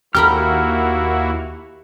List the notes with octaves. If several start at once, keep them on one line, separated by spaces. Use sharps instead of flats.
D#2 A#3 E4 F#4 G4 A#4 B5 F6